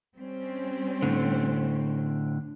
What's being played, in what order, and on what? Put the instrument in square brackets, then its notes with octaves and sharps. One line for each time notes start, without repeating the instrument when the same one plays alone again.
[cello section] G3 C4 C#4
[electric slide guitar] A2 D3